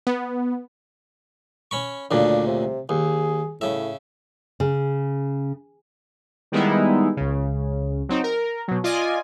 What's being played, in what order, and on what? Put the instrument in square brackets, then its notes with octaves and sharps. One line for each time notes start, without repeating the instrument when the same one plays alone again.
[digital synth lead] B3
[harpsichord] C#4 B5 C#6
[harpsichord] D2 A#2 C#3 [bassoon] D4
[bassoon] C3
[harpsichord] D#2 [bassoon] G#4
[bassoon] A2 [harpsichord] C#3 E5
[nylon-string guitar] C#3
[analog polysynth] D#3 G3 G#3 B3 D#4 E4
C#2 C#3
F#3 C4 D#4
A#4
B2 F#3
F4 D5 D#5 G#5